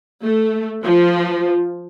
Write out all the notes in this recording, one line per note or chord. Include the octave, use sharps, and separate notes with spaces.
A3
F3